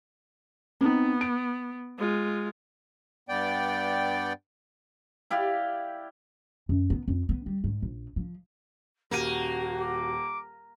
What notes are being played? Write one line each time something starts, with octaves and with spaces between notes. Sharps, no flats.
B3 C4 D#4
D7
G#3 F4
G2 B3 D5 G5
E4 G4 D5 F5
F#2
B3
F2
B3
G3
G#2
A#1
F3
D#1 A#3 F#4 D#7
D6